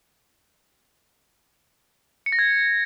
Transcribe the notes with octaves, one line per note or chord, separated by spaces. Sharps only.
C#7
A#6
G#6